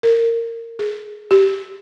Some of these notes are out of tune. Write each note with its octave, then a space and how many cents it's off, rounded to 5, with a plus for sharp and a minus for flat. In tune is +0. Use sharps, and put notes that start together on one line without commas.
A#4 -20
G#4 +15
G4 -10